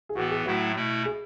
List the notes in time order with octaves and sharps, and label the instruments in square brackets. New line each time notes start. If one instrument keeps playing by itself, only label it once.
[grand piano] G#4
[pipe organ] A2 E3 B3 [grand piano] F#4
[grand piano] G#4
[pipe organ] A2 F#3 A3 E4 [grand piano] F#4
[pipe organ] B2 A3 E4
[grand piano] G#4